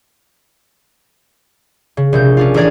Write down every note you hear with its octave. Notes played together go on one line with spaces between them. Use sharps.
C#3
A#1 C3 G6
C#4 D4 F4
A1 G#4 A#4 D5 G#6